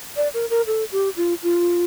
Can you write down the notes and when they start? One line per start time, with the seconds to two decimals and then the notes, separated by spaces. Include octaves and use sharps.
0.16 D5
0.34 A#4
0.50 A#4
0.67 A4
0.92 G4
1.17 F4
1.43 F4